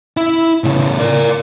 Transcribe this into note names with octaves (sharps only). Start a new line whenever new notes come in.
E4
A2 C#3
A#4 D5